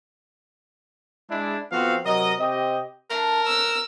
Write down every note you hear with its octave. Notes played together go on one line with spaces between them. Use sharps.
G#3 D4 E4
F3 B3 C4 F#4 A4 F5
C3 F#3 A#4 D#5
C3 C4 G4 D#5
A3 D4 A#4
C#5 E6 F#6